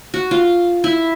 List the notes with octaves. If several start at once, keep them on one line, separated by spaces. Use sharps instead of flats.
F#4
F4
E4